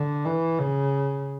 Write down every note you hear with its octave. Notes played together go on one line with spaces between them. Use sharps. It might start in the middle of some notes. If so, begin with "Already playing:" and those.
Already playing: D3
E3
C#3